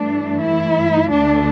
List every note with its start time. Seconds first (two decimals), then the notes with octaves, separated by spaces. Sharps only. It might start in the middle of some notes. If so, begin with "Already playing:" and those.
Already playing: G2 E3 A3 D4
0.41 E4
1.10 D2 D3 A3 D4